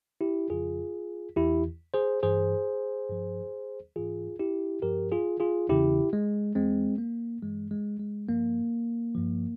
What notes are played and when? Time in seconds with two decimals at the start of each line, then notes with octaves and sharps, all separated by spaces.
0.21 E4 G4
0.50 F2 C#3 F3 F4 G#4
1.36 E2 E3 E4 G4
1.94 G#4 C5
2.23 G2 E3 G#4 C5
3.09 G2 F3
3.96 G#2 E3 F4 G#4
4.39 E4 G4
4.82 G2 F3 G4 A#4
5.12 F4 G#4
5.40 F4 G#4
5.69 E2 C#3 E3 E4 G4
6.13 G#3
6.55 E2 E3 G#3 C4
6.98 A#3
7.42 G2 E3 G#3
7.71 G#3
8.00 G#3
8.29 G2 F3 A#3
9.15 G2 F3